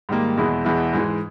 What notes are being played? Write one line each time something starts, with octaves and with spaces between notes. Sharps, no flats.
G#2 D#3 G3 A#3
E2 B2 G#3 B3 E4
E2 B2 G#3 B3 E4
G#2 E3 G#3